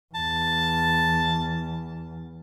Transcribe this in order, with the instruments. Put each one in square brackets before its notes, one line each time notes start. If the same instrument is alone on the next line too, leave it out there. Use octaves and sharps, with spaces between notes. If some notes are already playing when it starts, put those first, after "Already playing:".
[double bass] E2 [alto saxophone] A5